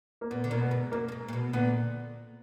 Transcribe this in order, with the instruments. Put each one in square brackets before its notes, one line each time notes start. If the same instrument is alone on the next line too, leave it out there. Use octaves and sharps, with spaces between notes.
[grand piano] A#3
[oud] A#2 [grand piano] B3
[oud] D3
[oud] B2 [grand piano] A#3
[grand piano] B3
[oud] G#2
[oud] F#2 [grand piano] A#3
[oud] F#2
G#2
A#2
B2
[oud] A#2 D3 [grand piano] B3